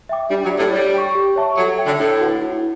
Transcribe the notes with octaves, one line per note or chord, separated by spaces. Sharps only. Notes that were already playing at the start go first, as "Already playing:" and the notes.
E5 G5 D6
G3 D4
F#3
G4 D5
A2
G3 C#5
G5 C#6
G4
C#5 E5 A5 C#6
F#3 A4
E5 G5
D3
A2 D4
F#4 B4 F#5
E4